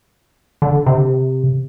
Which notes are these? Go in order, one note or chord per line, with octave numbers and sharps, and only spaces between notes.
D3
C3